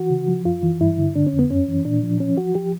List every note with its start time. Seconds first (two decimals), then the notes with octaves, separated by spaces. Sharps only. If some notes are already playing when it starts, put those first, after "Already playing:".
Already playing: E3 F#4
0.10 C#3
0.28 F3
0.45 F#2 F4
0.63 E3
0.80 G2 E4
0.98 D3
1.15 D3 D4
1.27 C#4
1.33 F2
1.39 B3
1.50 F#2 C#4
1.68 E3
1.85 A#2 D4
2.03 F3
2.20 F3 C#4
2.38 F3 F#4
2.55 F3 G4